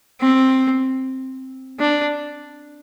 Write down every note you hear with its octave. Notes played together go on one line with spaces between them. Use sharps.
C4
D4